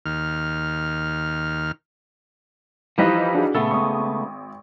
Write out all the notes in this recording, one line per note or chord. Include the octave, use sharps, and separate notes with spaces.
D#2 F6
E3 F3 G3 D#4 B4 D#5
D4 F#4 G#4
A#2 C#3 A3 B3 A4
G#1 C#6 D#6